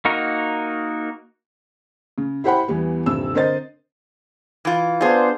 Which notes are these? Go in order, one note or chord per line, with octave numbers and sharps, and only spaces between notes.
A#3 D#4 F#4 A#4
C#3
E4 G4 C5 F#5 G5 B5
E2 E3 G3 B3
D#1 G2 C3 E6
D3 C4 A#4 C5 D#5 A6
E3 F4
B3 D4 F4 G#4 C5